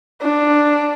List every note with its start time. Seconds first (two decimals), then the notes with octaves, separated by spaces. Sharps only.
0.22 D4